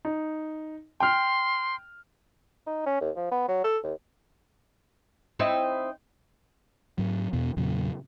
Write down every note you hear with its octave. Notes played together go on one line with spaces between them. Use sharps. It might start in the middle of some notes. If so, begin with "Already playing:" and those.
D#4
G5 C6 F6
D#4
C#4
D#2
F3
B3
F#3
A4
D#2
C4 D#4 E4
G#2 F#3
E2 B2 B3
E2 A#2 C#3 F#3